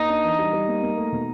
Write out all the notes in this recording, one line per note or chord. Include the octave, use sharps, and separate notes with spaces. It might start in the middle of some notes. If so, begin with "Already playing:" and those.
Already playing: A#3 D#4
D4
E3
G3
G3
A#3
A#3
A3
B2